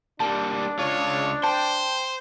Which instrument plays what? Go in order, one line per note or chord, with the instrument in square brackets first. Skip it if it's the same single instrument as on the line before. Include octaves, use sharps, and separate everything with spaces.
[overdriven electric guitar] G3 A#3 [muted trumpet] D4 [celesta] A5
[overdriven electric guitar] C#2 F4 [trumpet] C#5
[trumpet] C5 [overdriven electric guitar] G5 [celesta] A5